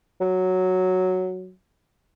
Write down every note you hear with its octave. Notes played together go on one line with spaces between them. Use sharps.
F#3